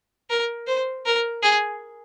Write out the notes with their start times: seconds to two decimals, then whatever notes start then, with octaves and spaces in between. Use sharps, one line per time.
0.30 A#4
0.67 C5
1.06 A#4
1.42 G#4